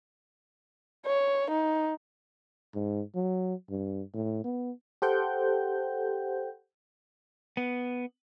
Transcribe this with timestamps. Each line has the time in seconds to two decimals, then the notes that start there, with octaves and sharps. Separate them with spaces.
1.06 C#5
1.50 D#4
2.74 G#2
3.15 F#3
3.69 G2
4.14 A2
4.44 B3
5.02 G4 A4 C5 F#5 G5 G6
7.57 B3